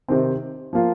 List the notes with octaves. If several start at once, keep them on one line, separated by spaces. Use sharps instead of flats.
C3 D#3 C4
F3 A#3 F4